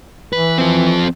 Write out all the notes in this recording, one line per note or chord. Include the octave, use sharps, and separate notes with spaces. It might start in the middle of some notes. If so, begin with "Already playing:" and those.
E3 B4
F3 C4